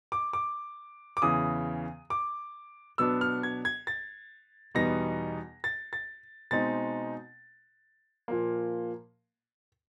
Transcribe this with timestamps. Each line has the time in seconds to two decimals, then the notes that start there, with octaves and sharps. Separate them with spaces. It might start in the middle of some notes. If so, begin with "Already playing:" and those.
0.12 D6
0.33 D6
1.17 D6
1.22 E2 C#3 E3 D#6
2.10 D6
2.98 B2 F#3 B3 D4 E6
3.21 F6
3.43 G#6
3.65 G#6
3.87 A6
4.75 E2 B2 G3 B3 D#4 A#6
5.64 A6
5.93 A6
6.51 B2 G#3 C4 D#4 A6
8.28 A#2 F3 A#3